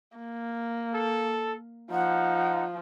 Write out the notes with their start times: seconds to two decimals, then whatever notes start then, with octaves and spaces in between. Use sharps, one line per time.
0.17 A#3
0.94 A4
1.91 F3 D#4 F#5